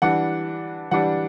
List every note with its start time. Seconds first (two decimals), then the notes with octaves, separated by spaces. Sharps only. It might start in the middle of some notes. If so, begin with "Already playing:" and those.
0.02 E3 G3 D4 F#5
0.91 E3 G3 D4 F#5